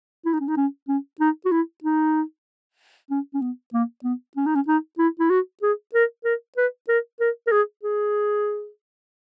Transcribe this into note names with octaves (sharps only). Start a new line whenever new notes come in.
E4
D#4
C#4
D#4
C#4
C#4
D#4
F#4
E4
D#4
C#4
C#4
B3
A#3
B3
C#4
D#4
C#4
D#4
E4
E4
F#4
G#4
A#4
A#4
B4
A#4
A#4
A#4
G#4
G#4